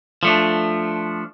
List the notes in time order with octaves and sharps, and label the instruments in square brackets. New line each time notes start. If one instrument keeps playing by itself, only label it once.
[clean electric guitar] F3 A3 D4